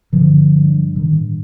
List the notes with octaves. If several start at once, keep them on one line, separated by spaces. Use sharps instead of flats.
G2 D3 F3
G2
A2 D#3